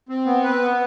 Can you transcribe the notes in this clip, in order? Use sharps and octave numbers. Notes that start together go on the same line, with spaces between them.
C4
B3
B4
B3